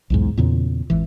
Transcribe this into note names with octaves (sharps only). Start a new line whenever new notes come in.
B1 E2 G#2
E2 A#2 C#3
G#1 E3